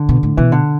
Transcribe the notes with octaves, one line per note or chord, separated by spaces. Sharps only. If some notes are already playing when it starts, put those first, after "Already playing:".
Already playing: D3
B2
A2
B2 E3
D3